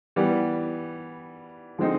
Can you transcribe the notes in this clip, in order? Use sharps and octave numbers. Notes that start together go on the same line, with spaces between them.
E3 G3 B3
D3 F3 G#3 C4 D#4